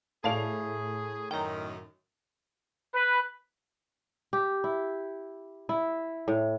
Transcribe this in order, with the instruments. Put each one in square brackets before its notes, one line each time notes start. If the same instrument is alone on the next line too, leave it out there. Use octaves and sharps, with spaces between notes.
[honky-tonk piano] A2 C7 F7 [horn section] G#4 [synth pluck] D5 F5 A5
[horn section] F#2 D#3 [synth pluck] G5 A#5
[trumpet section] B4
[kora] G4
E4
E4
A2